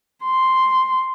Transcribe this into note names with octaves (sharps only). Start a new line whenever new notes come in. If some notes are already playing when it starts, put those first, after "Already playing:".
C6